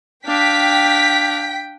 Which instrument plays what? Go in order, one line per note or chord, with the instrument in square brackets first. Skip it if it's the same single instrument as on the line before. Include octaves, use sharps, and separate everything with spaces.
[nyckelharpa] D4 F5 [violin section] G5 B6